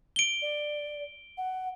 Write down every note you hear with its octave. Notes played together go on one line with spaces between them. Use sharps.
D7 G7
D5
F#5